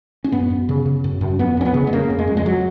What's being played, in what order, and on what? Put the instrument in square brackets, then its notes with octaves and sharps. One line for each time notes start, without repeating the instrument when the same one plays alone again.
[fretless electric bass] C#4
F#2 B3
F#2
C#3
C#3
F#2
F#2
F2 B3
F2 C#4
B3
C#3
G#3
C#3 A#3
F2
G#3
F2
G#3
F#3